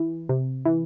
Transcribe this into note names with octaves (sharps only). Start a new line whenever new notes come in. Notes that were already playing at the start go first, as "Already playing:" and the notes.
Already playing: E3
C3
E3